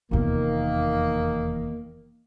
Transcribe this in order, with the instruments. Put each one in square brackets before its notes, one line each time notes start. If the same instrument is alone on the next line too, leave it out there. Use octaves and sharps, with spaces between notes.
[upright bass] F1 E2 [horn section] D#3 A#3